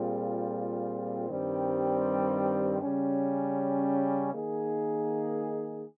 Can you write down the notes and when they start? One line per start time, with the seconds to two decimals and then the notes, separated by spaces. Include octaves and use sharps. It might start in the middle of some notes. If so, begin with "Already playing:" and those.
Already playing: A#2 G3 C4 F4 G#4
1.29 G2 D#3 G3 C4
2.81 C#3 G3 C#4
4.33 D#3 A#3 D#4 G#4